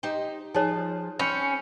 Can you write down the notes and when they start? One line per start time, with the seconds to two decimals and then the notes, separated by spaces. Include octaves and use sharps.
0.03 D#4 G4 C5
0.54 F3 D#4 G#4 C#5
1.19 C4 C#4 B5 G6 C#7